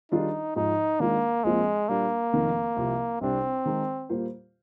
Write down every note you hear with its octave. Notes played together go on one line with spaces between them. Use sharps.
D#3 G3 D4 D#4 F4 G#4
G#2 F3 G#3 D#4
D#3 G#3 A#3 D4 F4
A#1 A#2 F3 G#3 C4 F4
A#2 G3 A#3 D4
F1 F2 D#3
C2 C3 F3
C2 C3 G3 C4 D4
D#3 G#3 D#4 G#4
A#2 G3 A#3 F4 C5